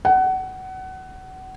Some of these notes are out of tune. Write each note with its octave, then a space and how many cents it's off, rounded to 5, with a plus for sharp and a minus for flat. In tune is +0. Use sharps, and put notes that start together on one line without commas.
F#5 +25